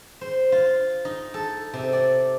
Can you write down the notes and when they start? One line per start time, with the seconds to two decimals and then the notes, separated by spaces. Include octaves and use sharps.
0.21 C5
0.52 F4
1.05 D#4
1.34 A4
1.74 C3
1.93 D5